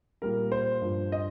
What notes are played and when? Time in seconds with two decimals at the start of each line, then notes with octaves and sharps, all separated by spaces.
0.22 A#2 G3 A#4
0.52 C5
0.81 G2 F3
1.12 D#5